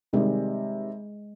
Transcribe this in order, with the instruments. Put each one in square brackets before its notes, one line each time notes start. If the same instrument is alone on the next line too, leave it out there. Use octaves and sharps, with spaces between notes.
[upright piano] C3 D#3 G3 [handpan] G#3